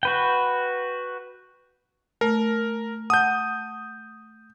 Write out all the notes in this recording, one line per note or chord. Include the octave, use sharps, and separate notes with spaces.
F#4 B4 G5
A3 A#4
F#5 A5 D#6 G6